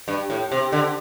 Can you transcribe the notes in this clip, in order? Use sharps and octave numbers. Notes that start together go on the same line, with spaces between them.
G2
A2
C3
D3